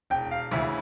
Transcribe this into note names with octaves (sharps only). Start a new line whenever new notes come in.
E1 G5
F5
D2 C#3 E3 E5